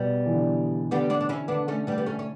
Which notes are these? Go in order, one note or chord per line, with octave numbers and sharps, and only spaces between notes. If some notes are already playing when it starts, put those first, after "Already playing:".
Already playing: B2 G3 B3
E3
D3
D3 G3 B3
B3 D4
D4
C#4 E4
D3 B3 D4
A3 C#4
G3 B3
B3
A3 C#4
C#4